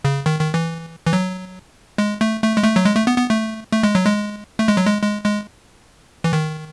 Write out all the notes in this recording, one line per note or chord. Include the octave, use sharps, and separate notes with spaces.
C#3
D#3
D#3
E3
E3
F#3
G#3
A3
A3
G#3
A3
F#3
G#3
A3
B3
B3
A3
A3
G#3
F#3
G#3
A3
G#3
F#3
G#3
G#3
G#3
E3
D#3